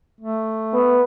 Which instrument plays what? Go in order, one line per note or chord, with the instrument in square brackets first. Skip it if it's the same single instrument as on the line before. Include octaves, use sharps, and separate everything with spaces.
[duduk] A3
[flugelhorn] B3